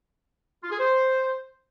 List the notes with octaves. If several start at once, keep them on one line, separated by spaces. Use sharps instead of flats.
F4
G#4
C5